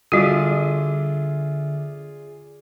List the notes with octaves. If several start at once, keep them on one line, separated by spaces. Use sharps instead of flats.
D3 G3 F4 F#4 G#4 D5 E5 D6